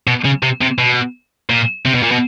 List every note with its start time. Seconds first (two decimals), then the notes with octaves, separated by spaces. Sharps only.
0.07 B2
0.25 C#3
0.43 C3
0.61 C3
0.78 B2
1.50 A#2
1.85 C3
1.95 B2
2.02 A#2
2.11 B2